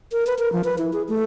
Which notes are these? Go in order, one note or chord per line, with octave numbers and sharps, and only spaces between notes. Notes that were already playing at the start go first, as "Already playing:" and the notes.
A#4
B4
A#4
F3
B4
E4
G#4
A3